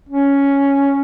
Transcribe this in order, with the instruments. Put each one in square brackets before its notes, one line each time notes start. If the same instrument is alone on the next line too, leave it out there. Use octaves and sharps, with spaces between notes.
[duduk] C#4